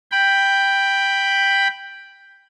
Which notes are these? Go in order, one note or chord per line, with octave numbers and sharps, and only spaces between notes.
G5 B5